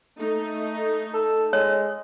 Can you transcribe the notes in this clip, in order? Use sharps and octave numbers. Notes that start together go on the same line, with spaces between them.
A3 D#4
A4
G#3 C#5